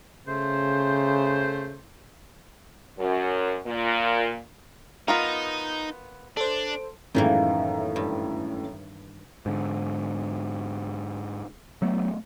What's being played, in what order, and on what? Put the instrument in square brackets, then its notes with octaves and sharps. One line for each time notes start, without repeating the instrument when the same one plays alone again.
[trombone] C#3 [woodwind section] A3 C5
[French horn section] F#2
A#2
[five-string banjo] B3 F4 A#4 [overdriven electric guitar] D#4
[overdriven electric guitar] D4 [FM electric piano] A4 C5
[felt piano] F#2 A2 G#3 [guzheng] D#3 E3 A#3
[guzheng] G2
[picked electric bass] G#2 D3
F#3 A3 B3